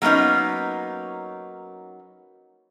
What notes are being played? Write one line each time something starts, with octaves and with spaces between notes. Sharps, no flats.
F#3 A#3 B3 C#4 D#4